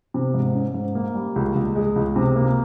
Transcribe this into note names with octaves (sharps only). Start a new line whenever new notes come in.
C3
G#2
C#4
G#2
A#3
G3
C#2
C#2
G#3
C#2
C3
A#3